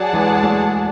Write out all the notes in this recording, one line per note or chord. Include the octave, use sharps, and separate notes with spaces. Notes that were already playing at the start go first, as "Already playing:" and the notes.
Already playing: F#3 G#4 D5 F#5 A5
E3 G#3
G#3
F#3 A3